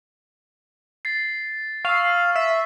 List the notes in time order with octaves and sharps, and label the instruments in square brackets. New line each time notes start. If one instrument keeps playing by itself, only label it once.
[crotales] A6 C7
[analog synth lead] F5 [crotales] C#6 E6
[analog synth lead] E5